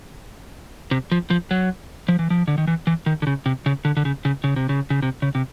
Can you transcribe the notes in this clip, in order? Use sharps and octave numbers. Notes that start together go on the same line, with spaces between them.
C3
F3
F3
F#3
F3
E3
F3
D3
D#3
E3
E3
D#3
D3
C#3
C3
C#3
D3
D3
C#3
C#3
C#3
C3
C#3
C#3
C3
C#3
C3